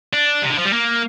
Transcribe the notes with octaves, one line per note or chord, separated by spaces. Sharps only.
D4
C3
D3
F3
G3
A#3